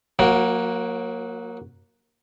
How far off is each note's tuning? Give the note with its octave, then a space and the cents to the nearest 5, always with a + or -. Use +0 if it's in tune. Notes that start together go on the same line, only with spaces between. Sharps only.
F#3 -35 A#3 +5 F#4 +0